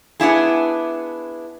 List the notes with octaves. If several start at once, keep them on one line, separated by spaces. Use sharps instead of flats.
B3 D4 E4 G#4